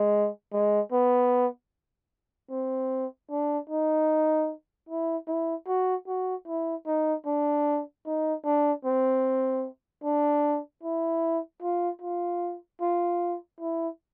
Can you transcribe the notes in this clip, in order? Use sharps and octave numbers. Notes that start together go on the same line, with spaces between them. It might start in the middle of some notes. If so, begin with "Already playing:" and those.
Already playing: G#3
G#3
B3
C4
D4
D#4
E4
E4
F#4
F#4
E4
D#4
D4
D#4
D4
C4
D4
E4
F4
F4
F4
E4